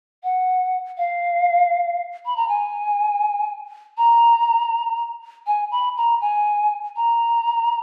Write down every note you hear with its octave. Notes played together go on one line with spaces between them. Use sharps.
F#5
F5
B5
A#5
G#5
A#5
G#5
B5
A#5
G#5
A#5